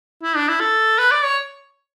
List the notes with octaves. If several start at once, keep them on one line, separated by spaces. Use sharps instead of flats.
E4
D4
E4
A4
B4
D5
C#5